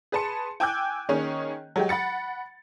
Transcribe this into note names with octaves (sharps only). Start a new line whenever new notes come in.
G#4 B4 A5 C6 C#7
G5 G#5 D6 E6 F#6 G6
D#3 A#3 C#4 G#4 C#5
F#3 G#3 G4
F#5 B5 A6 C#7